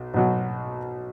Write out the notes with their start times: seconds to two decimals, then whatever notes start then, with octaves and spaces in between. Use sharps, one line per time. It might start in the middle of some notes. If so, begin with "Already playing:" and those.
Already playing: B1
0.14 B1 B2 F#3